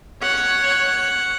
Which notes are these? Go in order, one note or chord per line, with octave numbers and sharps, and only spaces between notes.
C#5 F#5